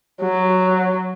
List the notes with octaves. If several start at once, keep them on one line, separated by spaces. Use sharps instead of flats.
F#3